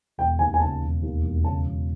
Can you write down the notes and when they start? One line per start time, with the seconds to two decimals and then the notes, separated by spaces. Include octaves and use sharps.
0.18 E1 G5
0.39 D#2 G#5
0.54 G#5
0.60 C#3 A5
0.82 E1
1.02 D#2
1.23 E1
1.44 C#3 A5
1.65 E1